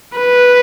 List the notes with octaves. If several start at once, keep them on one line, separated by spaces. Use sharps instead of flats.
B4